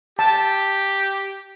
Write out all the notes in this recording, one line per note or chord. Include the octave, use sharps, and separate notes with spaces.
G4 A5